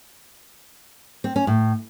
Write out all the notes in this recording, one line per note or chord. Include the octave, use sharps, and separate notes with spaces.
C4
C#4
A2